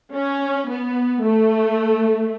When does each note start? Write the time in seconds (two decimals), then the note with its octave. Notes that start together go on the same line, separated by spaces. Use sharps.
0.15 C#4
0.70 B3
1.22 A3